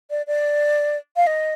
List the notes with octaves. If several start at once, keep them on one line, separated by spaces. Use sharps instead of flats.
D5
D5
F5
D#5